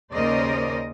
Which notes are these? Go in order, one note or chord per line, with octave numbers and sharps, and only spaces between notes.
D#2 C#3 A#4 C5 D5 D#5